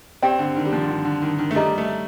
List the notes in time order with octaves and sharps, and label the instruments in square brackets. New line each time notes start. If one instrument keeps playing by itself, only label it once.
[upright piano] C4 [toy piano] G4 D5 G5
[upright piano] D3
D#3
G3
F3
D3
D#3
D3
D#3
D#3
A3
[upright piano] G3 [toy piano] D#4 A4 D#5 A#5
[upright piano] A3